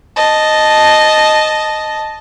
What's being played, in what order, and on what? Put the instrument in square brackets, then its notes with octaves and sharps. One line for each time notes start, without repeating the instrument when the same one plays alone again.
[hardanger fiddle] D#5 A5